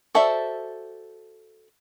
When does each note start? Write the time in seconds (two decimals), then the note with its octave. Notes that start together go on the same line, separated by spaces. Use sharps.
0.15 F#4 A4 C5 D5 E5